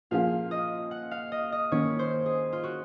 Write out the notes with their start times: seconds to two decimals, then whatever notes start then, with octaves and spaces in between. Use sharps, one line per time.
0.11 A#2 F3 A#3 F4 G#4 F5
0.51 D#5
0.91 F#5
1.11 F5
1.32 D#5
1.52 D#5
1.72 D#3 A#3 C#4 C#5
1.99 C5
2.26 G#4
2.53 F4
2.63 F#4